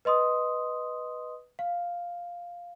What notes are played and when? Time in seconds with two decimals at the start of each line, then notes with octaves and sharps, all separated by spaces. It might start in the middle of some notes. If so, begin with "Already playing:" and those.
0.05 B4 D#5 C6 D#6
1.59 F5